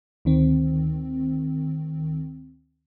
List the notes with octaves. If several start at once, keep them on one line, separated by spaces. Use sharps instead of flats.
D2 D#3 C4